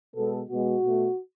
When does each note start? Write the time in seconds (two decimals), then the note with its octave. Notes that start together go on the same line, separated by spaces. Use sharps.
0.15 B2 G#3 B3 A4
0.49 B2 G#3 B3 F#4
0.82 B2 A3